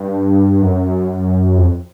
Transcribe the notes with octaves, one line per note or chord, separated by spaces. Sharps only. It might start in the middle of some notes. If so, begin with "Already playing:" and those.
Already playing: G2
F#2
F2